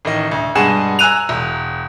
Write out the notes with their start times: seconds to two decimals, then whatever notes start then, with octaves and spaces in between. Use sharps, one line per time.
0.05 A1 D#3 D#5
0.31 D2
0.55 G2 B2 G#3 G#4 F#5 E7
0.99 G#5 A#5 E6 F#6 D#7 F7
1.29 E1